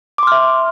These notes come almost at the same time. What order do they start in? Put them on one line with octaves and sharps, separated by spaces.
D6 C6 F6 E5